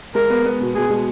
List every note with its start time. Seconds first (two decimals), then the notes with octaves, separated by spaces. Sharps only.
0.15 G#3 A#4
0.30 B3
0.46 B3
0.61 B2
0.75 B2 G#4
0.90 G#3